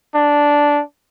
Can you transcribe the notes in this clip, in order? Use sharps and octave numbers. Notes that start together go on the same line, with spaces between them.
D4